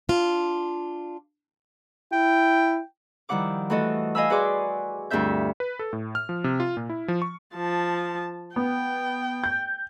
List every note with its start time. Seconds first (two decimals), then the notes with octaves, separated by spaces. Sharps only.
0.09 D4 F4
2.12 E4 G5
3.29 D#3 F3 G3 E4 F#5 D6
3.70 E3 A3 F#4 A4 D#5
4.15 D#5 F5 G#5 B5 E6
4.30 F#4 G#4 B4 D5 C6 D6
5.10 D2 G2 C4 F4 E5 G6
5.60 B4
5.79 A4
5.93 A2
6.15 F6
6.29 F3
6.44 C3
6.60 F4
6.77 A#2
6.90 E4
7.08 F3
7.22 C#6
7.55 F3 A5
8.56 B3 G5
9.44 G6